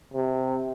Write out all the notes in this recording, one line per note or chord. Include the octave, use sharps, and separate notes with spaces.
C3